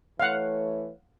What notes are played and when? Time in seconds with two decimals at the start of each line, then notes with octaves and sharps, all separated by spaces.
0.20 E3 A3 C#5 F5 F#5